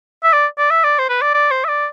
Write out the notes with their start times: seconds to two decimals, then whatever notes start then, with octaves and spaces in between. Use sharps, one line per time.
0.24 E5
0.33 D5
0.58 D5
0.70 E5
0.84 D5
0.99 C5
1.09 B4
1.22 D5
1.34 D5
1.51 C5
1.64 E5
1.69 D5